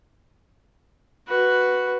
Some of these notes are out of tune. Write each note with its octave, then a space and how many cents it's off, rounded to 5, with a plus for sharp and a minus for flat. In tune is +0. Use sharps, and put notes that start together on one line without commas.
F#4 +0 B4 +0